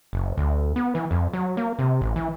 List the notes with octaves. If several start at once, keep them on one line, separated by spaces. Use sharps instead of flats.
F#1
D2
B3
E3
F2
F#3
A#3
C3
A1
E3